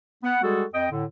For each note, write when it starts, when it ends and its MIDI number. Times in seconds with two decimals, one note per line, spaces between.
0.23 0.39 59
0.23 0.39 78
0.42 0.64 55
0.42 0.64 56
0.42 0.64 66
0.42 0.64 68
0.42 0.64 69
0.74 0.87 41
0.74 0.87 75
0.74 0.87 79
0.91 1.04 45
0.91 1.04 50